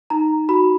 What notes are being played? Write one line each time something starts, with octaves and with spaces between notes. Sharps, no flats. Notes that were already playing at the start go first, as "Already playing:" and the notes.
D#4 A#5
F#4 B5